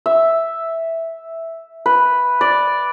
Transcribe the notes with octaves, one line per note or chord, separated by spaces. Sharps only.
E5
B4
D5